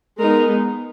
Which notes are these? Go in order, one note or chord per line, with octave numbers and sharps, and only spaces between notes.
G#3 B3 D#4 A#4